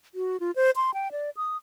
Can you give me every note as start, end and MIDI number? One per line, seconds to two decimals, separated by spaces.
0.15 0.40 66
0.40 0.51 65
0.56 0.71 72
0.76 0.94 84
0.94 1.11 79
1.12 1.30 74
1.37 1.57 87